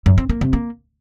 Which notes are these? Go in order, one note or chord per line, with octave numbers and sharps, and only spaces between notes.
F#2
C4
A#3
C3
A#3